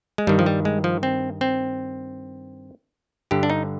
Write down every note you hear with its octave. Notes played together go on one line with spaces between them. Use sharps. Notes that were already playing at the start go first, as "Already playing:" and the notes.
G#3
G2 D#3 G3
F3
G3
G#3
F3
C4
C4
G2 D3 G4
D4
D#4